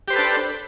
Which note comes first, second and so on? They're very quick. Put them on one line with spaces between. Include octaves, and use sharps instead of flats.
G4 C5 B4 A4 D4